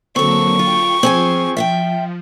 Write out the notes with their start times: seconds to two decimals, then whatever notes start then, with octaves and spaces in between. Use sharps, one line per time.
0.16 D3 F#3 A#3 C4 A4 C#6
0.59 F4 G5 G6
1.03 F3 C4 G#4 G#5
1.57 E5 F5 G5